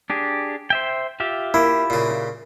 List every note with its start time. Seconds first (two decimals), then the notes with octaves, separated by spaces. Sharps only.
0.10 D4 G4 G#4
0.70 C5 E5 G5
1.20 F4 G4 E5
1.54 A#3 E4
1.90 A#2 C#3